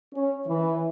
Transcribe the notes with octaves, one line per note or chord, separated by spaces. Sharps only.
C#4
E3